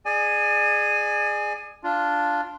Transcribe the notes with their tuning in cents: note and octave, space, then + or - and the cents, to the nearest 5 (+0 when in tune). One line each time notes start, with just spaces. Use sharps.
G#4 +0 D5 +35 G#5 +0
D4 +0 F4 +0